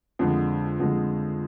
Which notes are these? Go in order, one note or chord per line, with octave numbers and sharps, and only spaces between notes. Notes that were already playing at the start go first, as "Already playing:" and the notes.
F2 D3 G#3
F2 D3 G#3